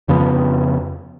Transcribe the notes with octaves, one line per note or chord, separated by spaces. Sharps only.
F2 C#3 F3 B3